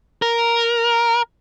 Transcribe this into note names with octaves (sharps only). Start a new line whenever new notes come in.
A#4